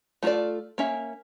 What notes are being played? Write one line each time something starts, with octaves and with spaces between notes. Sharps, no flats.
A3 F4 F#4 A4 D5
A#3 C#4 E5